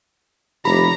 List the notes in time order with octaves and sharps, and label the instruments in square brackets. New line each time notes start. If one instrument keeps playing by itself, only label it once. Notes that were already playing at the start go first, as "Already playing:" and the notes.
[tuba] F1 [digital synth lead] G4 [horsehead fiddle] A#5 [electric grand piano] B5